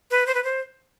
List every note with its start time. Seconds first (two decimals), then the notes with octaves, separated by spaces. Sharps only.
0.11 B4
0.26 C5
0.34 B4
0.44 C5